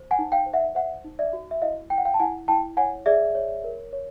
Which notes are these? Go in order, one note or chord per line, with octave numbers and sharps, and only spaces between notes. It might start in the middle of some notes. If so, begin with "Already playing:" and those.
Already playing: C5
F#5 G#5
D#4
F5 G5
C5
E5 F#5
C5 E5 F#5
D#4
D5 E5
F#4
E5
E4 D#5 F5
E4 G5
F#5
F5 G5
A5
E4 F#5 G#5
E4 G5 A5
C#5 F#5 G#5
G#4 D5 E5
C#5
A#4
C#5